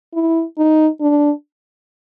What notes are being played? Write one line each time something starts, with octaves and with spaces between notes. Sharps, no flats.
E4
D#4
D4